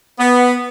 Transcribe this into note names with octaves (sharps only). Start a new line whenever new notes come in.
B3